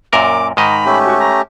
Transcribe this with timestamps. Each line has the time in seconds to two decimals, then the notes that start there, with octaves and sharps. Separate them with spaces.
0.13 F#2 A#2 A#4 D6
0.57 G#2 D#3 D#5 A#5 B5
0.86 A3 C#4 G4
1.06 F#4
1.19 A#5